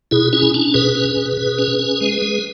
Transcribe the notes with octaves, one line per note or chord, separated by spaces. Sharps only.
B2 E4 G#4
C#4 E4 G#4
C#4 D4
B2 G#4 B4
C#4
B2
B2
C#4
C#4
G#3
G#3